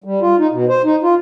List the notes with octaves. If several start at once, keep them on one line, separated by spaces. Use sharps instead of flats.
G3
F4
D#4
B2
C5
D#4
F4